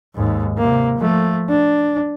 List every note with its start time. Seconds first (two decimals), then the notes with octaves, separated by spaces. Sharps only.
0.15 D#2 G#2
0.58 C3 A#3
0.98 F3 A3
1.49 D4